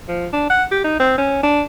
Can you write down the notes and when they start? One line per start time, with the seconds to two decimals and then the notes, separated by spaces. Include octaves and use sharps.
0.08 F3
0.33 D4
0.50 F#5
0.71 G4
0.84 D#4
1.00 C4
1.18 C#4
1.43 D4